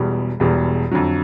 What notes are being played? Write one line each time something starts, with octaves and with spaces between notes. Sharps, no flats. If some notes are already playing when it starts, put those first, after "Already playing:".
Already playing: E1 E2 B2 G3
E1 E2 B2 G3
F2 D3 F#3